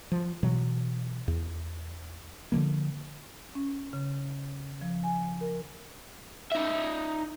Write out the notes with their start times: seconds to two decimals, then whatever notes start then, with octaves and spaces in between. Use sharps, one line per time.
0.12 F3
0.43 B2 E3 F#3
1.28 E2
2.52 D3 E3 F3 A#3
3.55 C#4
3.93 C#3
4.81 F3
5.04 G#5
5.41 A#4
6.51 D#4 E5